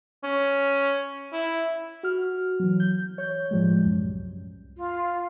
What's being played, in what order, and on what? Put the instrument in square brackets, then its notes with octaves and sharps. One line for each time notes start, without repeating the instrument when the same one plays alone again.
[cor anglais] C#4
E4
[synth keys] F#4 F6
E3 F#3
G6
C#5 G6
A2 F3 G3 G#3
C2 F#2
[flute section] F4